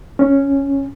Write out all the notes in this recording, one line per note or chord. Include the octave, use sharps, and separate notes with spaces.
C#4